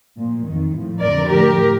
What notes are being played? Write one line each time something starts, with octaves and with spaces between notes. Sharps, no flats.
A#2 F3
F2 D#3
A2 F3
F2 D3 F3 A#4 D5
A2 F3 G4 A#4